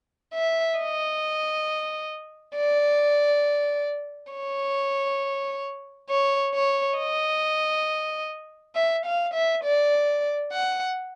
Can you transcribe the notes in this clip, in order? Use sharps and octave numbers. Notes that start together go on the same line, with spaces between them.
E5
D#5
D5
C#5
C#5
C#5
D#5
E5
F5
E5
D5
F#5